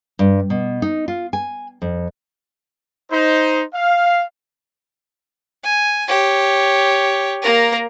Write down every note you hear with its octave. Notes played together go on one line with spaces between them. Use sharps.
G2
B2
D#4
F4
G#5
F2
D#4 C5
F5
G#5
G4 C#5
A#3 A#4